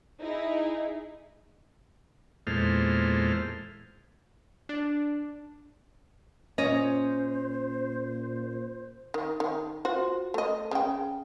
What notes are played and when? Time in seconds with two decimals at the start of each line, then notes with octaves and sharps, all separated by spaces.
0.21 D#4 E4 G#4
2.47 E2 A#2 G#3 A4 C5 F6
4.69 D4
6.58 A#2 C#4 C5 C#5 D#5
9.14 D#3
9.40 D#3
9.85 F4 F#4 C5
10.34 A3 D#5
10.71 C#3 G5